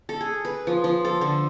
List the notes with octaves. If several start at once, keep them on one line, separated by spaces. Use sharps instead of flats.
A4
G#4
B4
F3
F3
A4
D3